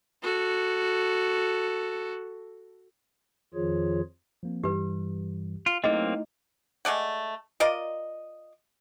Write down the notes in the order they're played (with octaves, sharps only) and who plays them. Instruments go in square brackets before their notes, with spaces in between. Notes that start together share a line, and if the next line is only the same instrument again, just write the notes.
[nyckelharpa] F#4 A4
[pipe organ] F2 D#3 F3 F4 G#4 C#5
[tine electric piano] F3 A#3 C4
[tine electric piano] G2 E3 G3 [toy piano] G4 B4
[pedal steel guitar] F4
[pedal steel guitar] F#3 A#3 C4 [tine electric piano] A3 D#4 E4 [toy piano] G#4 D#5
[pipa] G#3 A3 D5 F#5
F4 A#4 D5 D#5